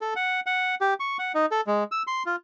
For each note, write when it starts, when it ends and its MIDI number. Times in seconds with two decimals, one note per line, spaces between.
0.01 0.14 69
0.16 0.40 78
0.46 0.75 78
0.81 0.94 67
1.00 1.17 85
1.19 1.32 78
1.35 1.46 63
1.51 1.61 69
1.67 1.84 56
1.92 2.03 88
2.07 2.23 84
2.26 2.36 65